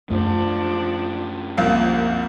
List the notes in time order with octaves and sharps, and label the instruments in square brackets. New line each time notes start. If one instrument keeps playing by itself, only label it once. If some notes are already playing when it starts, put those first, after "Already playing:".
[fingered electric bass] F#2 A3 [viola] F3 D4
[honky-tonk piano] C2 F3 F5 [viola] A#3